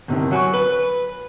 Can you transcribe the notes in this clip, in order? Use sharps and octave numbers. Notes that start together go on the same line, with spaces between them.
G1 C3 D#3
F#3 F#5 G#5 C#6
B4 F#7
B4